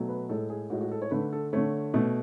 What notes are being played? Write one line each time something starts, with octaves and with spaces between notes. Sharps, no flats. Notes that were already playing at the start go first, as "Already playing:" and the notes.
Already playing: B2 F#3 A3
B4
A2 G#3 A4
G#4
A2 G#3 F#4
F#4
A4
C#5
D3 A3 B4
A4
D3 A3 C#5
B2 A3